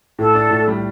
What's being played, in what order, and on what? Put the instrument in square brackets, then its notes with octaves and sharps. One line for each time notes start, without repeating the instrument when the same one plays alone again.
[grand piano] A2 [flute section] A4
[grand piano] D4
A2
G3